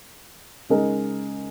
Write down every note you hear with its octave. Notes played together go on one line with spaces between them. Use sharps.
C#3 G#3 D#4 A#4